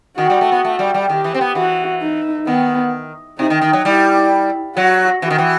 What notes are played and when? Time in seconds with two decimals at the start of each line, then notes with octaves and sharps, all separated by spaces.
0.18 D#3 F#4
0.30 G3
0.41 A3
0.52 B3
0.65 A3
0.79 G3
0.94 G3
1.10 D#3 G4
1.24 E3
1.35 C4
1.41 B3
1.55 E3 F#4
2.02 D#4
2.47 D#3 B3
3.39 C3 D#4
3.50 D#3
3.62 D#3
3.73 F#3
3.84 G3 E4
4.76 F#3 F#4
5.22 E3 F#4
5.30 D#3
5.38 E3